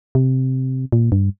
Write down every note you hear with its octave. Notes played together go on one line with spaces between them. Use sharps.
C3
A#2
G2